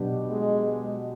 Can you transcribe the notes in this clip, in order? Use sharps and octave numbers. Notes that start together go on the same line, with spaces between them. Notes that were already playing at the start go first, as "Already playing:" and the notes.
Already playing: B2 F#3 B3 D4 G4
G#3